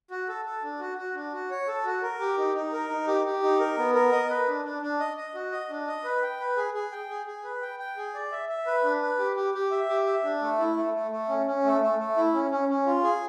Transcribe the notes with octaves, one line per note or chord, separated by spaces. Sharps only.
F#4
A4
A4
D4
F#4
F#4
D4
F#4
C#5
A4
F#4
A#4
G4
D#4
D#4
A#4
D#4
G4
G4
D#4
A#4
B3
A#4
D#5
B4
D4
D4
D4
D#5
D#5
F#4
D#5
D4
D#5
B4
G5
B4
G#4
G#4
G5
G#4
G#4
B4
G5
G5
G#4
D5
E5
E5
B4
D4
B4
G4
G4
G4
E5
G4
E5
D4
A3
E4
A3
A3
A3
C#4
C#4
A3
A3
A3
E4
C#4
C#4
C#4
F4
G#4